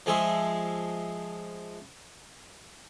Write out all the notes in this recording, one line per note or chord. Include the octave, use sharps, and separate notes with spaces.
F3 G#3 G#4 E5 C#6